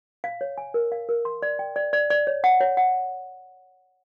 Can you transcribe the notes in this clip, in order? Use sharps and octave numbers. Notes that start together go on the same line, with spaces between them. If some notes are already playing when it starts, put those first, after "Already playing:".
F5
C#5
G#5
A#4
F5
A#4
C6
D5
G5
D5
D5
D5
C#5
F#5
C#5
F#5